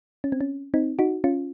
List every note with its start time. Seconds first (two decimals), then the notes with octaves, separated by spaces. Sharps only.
0.24 C#4
0.32 C4
0.41 C#4
0.74 C4 D#4
0.99 D#4 F#4
1.24 C#4 F4